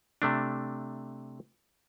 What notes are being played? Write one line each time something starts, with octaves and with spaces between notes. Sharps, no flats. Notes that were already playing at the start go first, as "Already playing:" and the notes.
C3 A3 D4